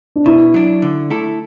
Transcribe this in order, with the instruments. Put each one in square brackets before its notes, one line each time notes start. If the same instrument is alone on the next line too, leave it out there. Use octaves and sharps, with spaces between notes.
[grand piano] D4
[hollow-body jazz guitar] B2 [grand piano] E4
[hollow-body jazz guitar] F#3 D4
D3
A3 E4 A4